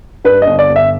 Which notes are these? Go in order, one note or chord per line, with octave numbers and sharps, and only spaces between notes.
G2 B4
D#5
G1
D5
G1
E5